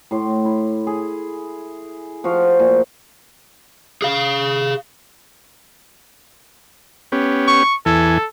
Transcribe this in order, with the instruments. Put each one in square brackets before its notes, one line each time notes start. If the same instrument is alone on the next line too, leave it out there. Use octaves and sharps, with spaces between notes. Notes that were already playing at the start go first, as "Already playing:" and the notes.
[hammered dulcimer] A2 C6
E4
G#4
F3 F#4 F5
A#2
[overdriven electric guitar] G#4 F5
[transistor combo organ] B3 C#4 G4
[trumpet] C#6
[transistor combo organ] E2 E3 G#5 [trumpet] A4